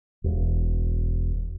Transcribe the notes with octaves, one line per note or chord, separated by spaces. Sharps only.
E1